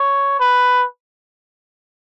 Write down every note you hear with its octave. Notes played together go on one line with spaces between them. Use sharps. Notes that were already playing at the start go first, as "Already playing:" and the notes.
Already playing: C#5
B4